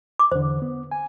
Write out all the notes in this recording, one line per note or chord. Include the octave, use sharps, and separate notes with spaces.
D6
E2 D3 C5
B3
G#5